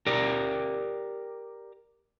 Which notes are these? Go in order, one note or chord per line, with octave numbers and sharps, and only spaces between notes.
G4 A#4 D5 A#5